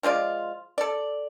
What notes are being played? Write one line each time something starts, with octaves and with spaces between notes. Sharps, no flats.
F3 G#3 F4 D5
A4 D5